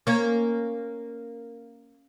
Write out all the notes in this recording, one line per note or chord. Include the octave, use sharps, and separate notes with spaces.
A#3 C#4